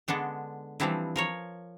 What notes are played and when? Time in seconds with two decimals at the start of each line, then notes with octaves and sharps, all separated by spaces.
0.08 D3 G#3 B3 D4 A4
0.80 E3 F3 G3 C4 D4 E4
1.16 F3 A#4 C#5